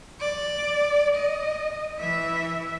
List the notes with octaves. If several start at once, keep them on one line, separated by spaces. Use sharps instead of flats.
D5
D#5
E3 E5